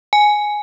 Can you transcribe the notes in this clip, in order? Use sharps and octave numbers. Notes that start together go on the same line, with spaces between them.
G#5